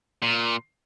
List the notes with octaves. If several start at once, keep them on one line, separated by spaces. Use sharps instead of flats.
A#2